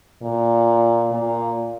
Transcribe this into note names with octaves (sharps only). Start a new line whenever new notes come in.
A#2
A#2